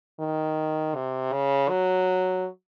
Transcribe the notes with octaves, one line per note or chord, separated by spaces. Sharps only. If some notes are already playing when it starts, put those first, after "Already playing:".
D#3
C3
C#3
F#3